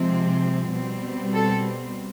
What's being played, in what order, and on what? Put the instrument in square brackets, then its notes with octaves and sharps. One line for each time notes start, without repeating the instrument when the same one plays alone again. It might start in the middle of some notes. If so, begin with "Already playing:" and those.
Already playing: [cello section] C3 F3 G#3 C4
B2 G3 C4
A4